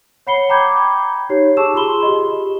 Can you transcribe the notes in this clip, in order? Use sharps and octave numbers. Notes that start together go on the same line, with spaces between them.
C#5 F#5 B5 C7 C#7 G7
G5 A#5 B5 D6 G6 G#6
D#4 G4 C#5 C7
G#4 A5 C#6 D6 E6 E7
F4 G#4 B5 C6 G7
G4 D#5